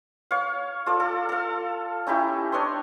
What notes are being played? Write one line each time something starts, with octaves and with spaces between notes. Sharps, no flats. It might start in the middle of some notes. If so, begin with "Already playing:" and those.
C#5 F5
F4 A4 D5
A4
A4 F5
C#4 D#4 E4 G4
D4 C#5 D#5 C6